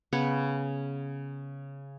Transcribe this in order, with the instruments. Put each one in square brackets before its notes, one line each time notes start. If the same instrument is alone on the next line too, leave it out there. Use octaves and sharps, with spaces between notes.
[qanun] C#3 B3 C#5 B5